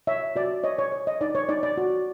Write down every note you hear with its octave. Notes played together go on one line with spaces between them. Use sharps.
C#5 E5
F#4 D5
C#5 D#5
C#5
C#5
D#5
D#4 D5
C#5
D#4 D5
D5
F#4